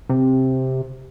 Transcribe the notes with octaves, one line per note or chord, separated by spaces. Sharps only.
C3